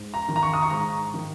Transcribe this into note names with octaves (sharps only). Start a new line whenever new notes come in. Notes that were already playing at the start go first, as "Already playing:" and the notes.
Already playing: G#2
A#5
D#3
A#5
C#6
D#6
C#6
G#2 A#5
D#3